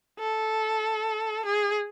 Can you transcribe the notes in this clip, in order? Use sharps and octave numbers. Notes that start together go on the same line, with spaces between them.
A4
G#4